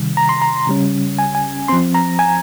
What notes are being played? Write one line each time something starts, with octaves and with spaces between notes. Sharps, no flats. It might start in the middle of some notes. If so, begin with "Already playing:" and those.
Already playing: C3 D#3 G3
A#5
C6
A#5
C#3 G3 C#4
G#5
G#5
F3 C4 C6
A#5
G#5